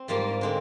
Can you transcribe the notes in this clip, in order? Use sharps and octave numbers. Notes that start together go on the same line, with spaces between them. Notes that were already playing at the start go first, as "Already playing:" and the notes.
Already playing: C4
G#2 G3 A#3 F4
D3 G#3 C4